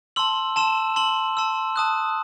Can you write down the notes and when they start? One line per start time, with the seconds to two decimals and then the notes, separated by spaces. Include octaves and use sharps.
0.16 A5 C6 E6 F#7
0.56 A5 C6 E6 E7
0.96 A5 C6 E6 F#7
1.37 A5 C6 E6
1.76 A5 D#6 F#6